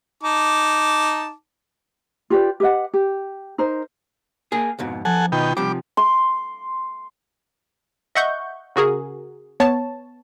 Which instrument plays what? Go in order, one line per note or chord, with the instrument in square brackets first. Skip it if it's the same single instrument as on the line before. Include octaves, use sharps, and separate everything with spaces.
[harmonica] D#4 A5 D6
[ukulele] F4 G4 B4 D5
G4 B4 D#5 F#5
G4
D#4 A#4 C5
[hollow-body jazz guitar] A#3 G#4
F2 G#2 B2
[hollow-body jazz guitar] B1 [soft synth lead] F3 [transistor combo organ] A4 F#5 G#5
[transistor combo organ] B2 D#3 G5 [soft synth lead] F4
[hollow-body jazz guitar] C3 F3 [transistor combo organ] G3 D6
[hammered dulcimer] C6 D6
[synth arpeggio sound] D#5 E5 F#5 C#6 G6
C#3 F#4 G#4 A#4
B3 C#5 A5